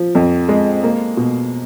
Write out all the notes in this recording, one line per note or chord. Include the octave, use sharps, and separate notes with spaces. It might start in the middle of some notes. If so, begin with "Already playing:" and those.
Already playing: F3
F2
G#3
A#3
B2